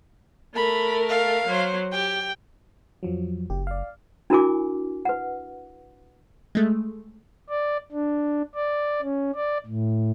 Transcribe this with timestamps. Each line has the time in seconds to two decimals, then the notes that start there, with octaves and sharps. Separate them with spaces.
0.55 A3 A#4 B5
1.09 F5
1.47 F#3 C5
1.92 G4 G5
3.03 F2 F3 F#3
3.50 F#1 G4
3.67 D5 F5
4.30 D4 E4 F#4 A#4 G#5 D6
5.05 B4 F#5
6.55 G#3 A3
7.50 D5
7.92 D4
8.55 D5
9.02 C#4
9.36 D5
9.66 A2